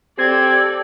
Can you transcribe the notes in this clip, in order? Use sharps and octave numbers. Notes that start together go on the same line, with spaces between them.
C4 G4 A4 D5 G#6